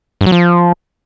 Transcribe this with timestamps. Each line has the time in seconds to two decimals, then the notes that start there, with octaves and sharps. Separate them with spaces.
0.21 G2
0.26 F#3
0.32 F3